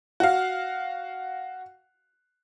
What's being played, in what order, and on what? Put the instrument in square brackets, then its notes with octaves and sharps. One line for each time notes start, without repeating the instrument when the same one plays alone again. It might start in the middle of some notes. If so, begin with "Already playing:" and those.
[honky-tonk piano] F#4 F5